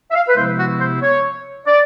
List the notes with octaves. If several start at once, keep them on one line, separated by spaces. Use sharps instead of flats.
E5
F5
B4
C3 F3 G#3 B3 E4 C5
F#4
C5
C#5
D5